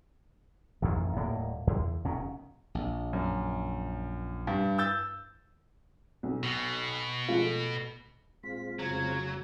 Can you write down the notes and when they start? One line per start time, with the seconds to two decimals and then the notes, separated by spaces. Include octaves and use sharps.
0.82 A1 F2 D#3
1.16 D#1 A2 A#3
1.67 E2
2.04 F1 B2 D#3 C#4
2.75 A#1
3.13 F#2
4.47 G2
4.78 E6 G6 A6
6.23 B1
6.43 B2
7.28 F3 G#3 F4
7.41 A3
8.43 A#2 G#3 C4 F4 B6
8.79 F1 C#3 F#3 G#6